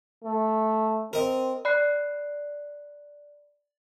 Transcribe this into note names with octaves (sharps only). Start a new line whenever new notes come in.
A3
C4 A#4 D#5
D5 B5 F#6 C7